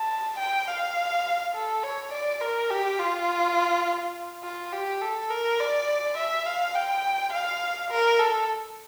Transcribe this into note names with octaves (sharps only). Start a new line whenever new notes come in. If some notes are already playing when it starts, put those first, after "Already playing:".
Already playing: A5
G5
F5
A4
C#5
D5
A#4
G4
F4
F4
G4
A4
A#4
D5
E5
F5
G5
F5
A#4
A4